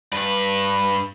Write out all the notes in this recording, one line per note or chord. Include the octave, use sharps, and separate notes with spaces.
G2 B4